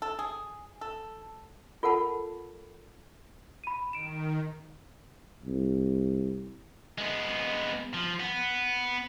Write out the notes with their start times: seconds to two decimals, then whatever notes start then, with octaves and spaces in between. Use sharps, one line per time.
0.02 A4
0.19 G#4
0.81 A4
1.83 F4 A4 A#4 F#5 A5 B5
3.64 B5 D#7
3.93 D#3 D7 E7
5.45 C2
6.98 G#3 B3
7.94 F3
8.20 B3